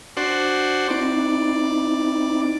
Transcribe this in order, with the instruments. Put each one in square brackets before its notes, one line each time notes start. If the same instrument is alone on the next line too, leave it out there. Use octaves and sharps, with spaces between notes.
[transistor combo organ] D4 F#4 C5
[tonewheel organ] C4 D#4 E4 [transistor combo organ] D5